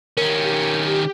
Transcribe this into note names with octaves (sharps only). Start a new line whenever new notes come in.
D#3 C#4 G4 A#4